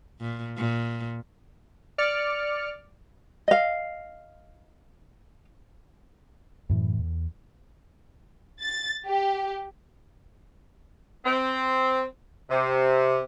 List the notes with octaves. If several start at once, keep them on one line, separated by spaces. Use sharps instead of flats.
A#2
A#2
D5 F6 C#7
D#5 F5
F#2 A2 E3
E2
A6
G4
C4
C3